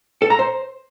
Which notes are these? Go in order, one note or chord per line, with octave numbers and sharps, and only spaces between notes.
A4
A#5
C5